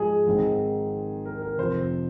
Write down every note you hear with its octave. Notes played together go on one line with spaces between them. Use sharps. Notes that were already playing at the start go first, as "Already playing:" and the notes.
Already playing: G#2 F3 G#3 G#4 D#5
G#1 G#2 D#3 C4
A#4
A#4
F1 F2 F3 C4 C5